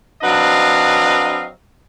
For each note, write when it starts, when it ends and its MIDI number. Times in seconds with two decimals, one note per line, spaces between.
0.22 1.47 54
0.22 1.47 60
0.22 1.47 62
0.22 1.47 71
0.22 1.47 75
0.22 1.47 77